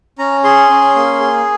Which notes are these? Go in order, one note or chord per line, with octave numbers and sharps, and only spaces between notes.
C#4 A#5
G#4 C6
C#4
A#3
G#4